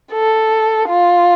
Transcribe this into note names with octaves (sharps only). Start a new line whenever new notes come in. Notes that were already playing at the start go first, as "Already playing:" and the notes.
A4
F4